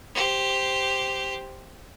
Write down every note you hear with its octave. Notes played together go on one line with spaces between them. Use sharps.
G4 C5